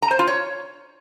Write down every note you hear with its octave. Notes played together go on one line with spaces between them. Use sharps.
A#5
C5
F4
C#5